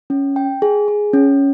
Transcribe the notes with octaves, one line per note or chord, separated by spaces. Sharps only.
C#4
G5
G#4
G#4
C#4